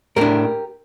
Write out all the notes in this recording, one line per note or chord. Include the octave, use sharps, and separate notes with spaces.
A2 A3 D4 G4 A#4